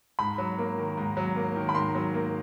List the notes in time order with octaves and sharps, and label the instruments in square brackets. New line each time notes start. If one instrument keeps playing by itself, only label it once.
[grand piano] G#2 [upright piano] B5
[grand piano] F#3
A#3
D#3
G#2
F#3
A#3
D#3
[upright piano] B5
[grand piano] G#2 [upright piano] C6
[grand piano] F#3
A#3